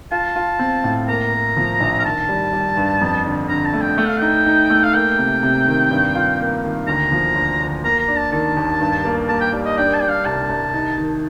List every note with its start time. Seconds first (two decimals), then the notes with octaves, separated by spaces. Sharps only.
0.11 F4 A5
0.36 F4
0.59 C4
0.84 A2
1.08 A#3 A#5
1.33 A#3
1.57 F3
1.80 A#1
1.99 A#5
2.04 D#3 A5
2.29 G3
2.53 G3
2.77 G2
3.01 F2
3.25 D3
3.49 D3 A#5
3.65 A5
3.74 A3
3.81 G5
3.97 A3 G5
4.07 F5
4.18 D#4 G5
4.46 D#4
4.70 A3
4.84 F5
4.94 A#3 G5
5.18 C3
5.43 C3
5.67 D#3
5.91 G2
6.15 F4
6.39 A#3
6.64 D#3
6.87 D2 A#5
7.12 F3
7.36 D2
7.60 D2
7.84 A#3 A#5
8.00 A#5
8.08 D4
8.16 A5
8.32 D#3 A5
8.57 D#2
8.80 G2
9.05 A#3
9.29 A#3 A5
9.40 G5
9.53 G3
9.65 D#5
9.77 D4 G5
9.94 A5
10.01 D4 G5
10.09 F5
10.25 C2 A5
10.49 C2
10.74 D#4
10.98 D#3